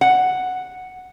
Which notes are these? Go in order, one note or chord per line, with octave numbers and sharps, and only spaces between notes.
F#5